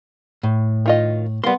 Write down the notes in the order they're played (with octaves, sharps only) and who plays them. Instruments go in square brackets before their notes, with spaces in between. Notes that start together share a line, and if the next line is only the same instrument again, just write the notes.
[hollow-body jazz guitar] A2
[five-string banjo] D#3 F4 D#5
[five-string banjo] G3 A#3 [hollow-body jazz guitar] B3 C6